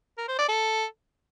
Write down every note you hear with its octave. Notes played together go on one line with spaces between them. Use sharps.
A#4
C5
D5
A4